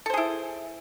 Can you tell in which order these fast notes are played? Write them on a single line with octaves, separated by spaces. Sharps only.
A4 C5 G#4 E4